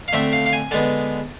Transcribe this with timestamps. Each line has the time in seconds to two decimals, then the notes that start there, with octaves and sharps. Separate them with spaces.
0.08 F5
0.13 D3 A3 C4 E5
0.33 F5
0.46 F5
0.53 G#5
0.71 D3 G#3 B3 A5